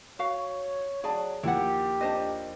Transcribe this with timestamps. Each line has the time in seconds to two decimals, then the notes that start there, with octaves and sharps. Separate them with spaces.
0.19 F#4 C#5 F5
1.04 F#3 G#4 D5 A5
1.43 D#2 F3 E4 G4 F#5
2.01 D4 C5 D#5